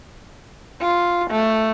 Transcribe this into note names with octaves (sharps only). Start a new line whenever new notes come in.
F4
A3